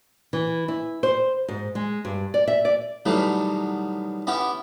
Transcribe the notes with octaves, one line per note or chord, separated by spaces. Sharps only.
E3
E4
C5
G#2
G#3
G2
D5
E5
D5
B2 D#3 E3 F#3 G3 A3
B3 C#4 E4 G4